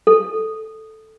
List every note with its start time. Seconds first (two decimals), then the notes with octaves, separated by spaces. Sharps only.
0.07 A4